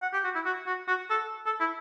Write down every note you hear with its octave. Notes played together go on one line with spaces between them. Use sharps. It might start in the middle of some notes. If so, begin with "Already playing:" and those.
F#5
G4
F#4
E4
F#4
F#4
F#4
A4
A4
E4